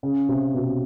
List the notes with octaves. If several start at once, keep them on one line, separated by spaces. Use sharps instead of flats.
C#3
C3
B2